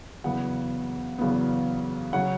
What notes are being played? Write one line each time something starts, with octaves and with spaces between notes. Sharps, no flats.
E2 C#3 F#3 B3 F#5
E2 C#3 F#3 B3
C#3 F#3 C#4 F#5